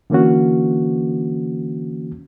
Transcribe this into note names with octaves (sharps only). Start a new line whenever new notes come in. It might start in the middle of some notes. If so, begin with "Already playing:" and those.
D3 E3 A#3 C#4 F#4